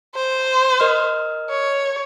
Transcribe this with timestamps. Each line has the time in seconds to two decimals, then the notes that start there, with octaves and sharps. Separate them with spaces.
0.16 C5
0.80 A#4 D#5 F6
1.50 C#5